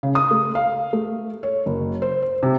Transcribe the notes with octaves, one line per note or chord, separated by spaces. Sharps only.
C#3
D#6
A3
F5
A3
C#5
F#1
C5
C5
C3